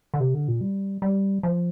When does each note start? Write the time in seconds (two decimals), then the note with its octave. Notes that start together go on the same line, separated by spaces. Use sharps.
0.14 D3
0.20 C3
0.34 D3
0.48 A#2
0.61 G3
1.02 G3
1.43 F3